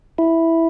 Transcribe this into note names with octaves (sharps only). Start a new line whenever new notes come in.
E4